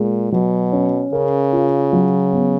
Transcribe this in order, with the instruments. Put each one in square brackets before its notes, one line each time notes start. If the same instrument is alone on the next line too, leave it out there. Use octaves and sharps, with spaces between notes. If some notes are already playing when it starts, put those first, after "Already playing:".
Already playing: [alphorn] A#2 [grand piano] G#3
[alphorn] B2 [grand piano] F#3
[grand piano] C#4
[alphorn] C#3 [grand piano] A#4
[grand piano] F4
F#3
B3